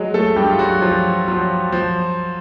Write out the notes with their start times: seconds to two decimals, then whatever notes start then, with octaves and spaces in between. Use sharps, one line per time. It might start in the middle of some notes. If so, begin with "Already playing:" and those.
Already playing: F#3 G#3 G#4
0.14 A3 A4
0.36 G2 G3 G4
0.51 F4
0.59 F#3 F#4
0.82 F3 F#3 F4
1.27 F3 F#3 F4
1.72 F3